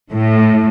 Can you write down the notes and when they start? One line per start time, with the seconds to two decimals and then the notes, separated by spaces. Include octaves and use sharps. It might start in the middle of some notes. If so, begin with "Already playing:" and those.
0.12 A2